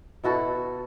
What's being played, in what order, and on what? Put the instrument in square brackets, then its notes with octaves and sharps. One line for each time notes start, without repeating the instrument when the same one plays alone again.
[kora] B2 E4 F#4 A4